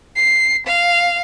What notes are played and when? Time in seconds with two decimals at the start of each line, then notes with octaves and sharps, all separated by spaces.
0.17 C7
0.67 F5